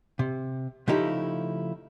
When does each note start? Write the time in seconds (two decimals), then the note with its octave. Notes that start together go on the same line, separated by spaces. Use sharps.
0.19 C3
0.88 C#3 F3 A3 D#4 E4 G4